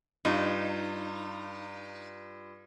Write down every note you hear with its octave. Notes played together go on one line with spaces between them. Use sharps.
G2 D#4 F4